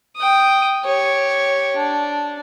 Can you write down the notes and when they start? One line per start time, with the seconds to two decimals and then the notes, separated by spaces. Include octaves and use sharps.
0.17 G5 D#6
0.85 G4 C#5
1.77 D4